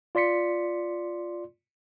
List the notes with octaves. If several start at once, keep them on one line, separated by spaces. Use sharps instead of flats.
F4 D5 C6 B6 C#7